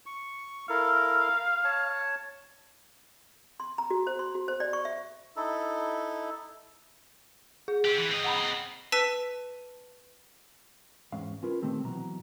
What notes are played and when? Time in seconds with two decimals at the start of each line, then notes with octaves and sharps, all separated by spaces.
0.06 C#6
0.69 E4 A4 A#4 F5
1.64 C#5 A5
3.60 C6
3.78 A#5
3.90 F#4
4.07 C5
4.19 C6
4.35 F#4
4.48 C5
4.60 D5
4.73 C#6
4.85 E5
5.37 D#4 E4 A4
7.68 G#4
7.85 C4 G4
7.98 E3
8.10 C4 D#5
8.24 F#5 A#5 B5
8.92 B4 A5 E6 B6 D#7
11.12 E2 G#2 C#4 F5
11.43 C#4 F4 A#4 B4
11.62 A#2 D#3 A3 C4 G4
11.84 B2 E3 F#3 A#5